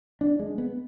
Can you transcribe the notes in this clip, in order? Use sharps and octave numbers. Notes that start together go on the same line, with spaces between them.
D4
G#3
B3